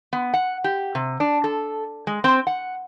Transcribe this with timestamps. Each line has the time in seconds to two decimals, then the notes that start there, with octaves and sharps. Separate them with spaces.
0.13 B3
0.34 F#5
0.64 G4
0.95 C3
1.20 D4
1.44 A4
2.07 G#3
2.24 C4
2.47 F#5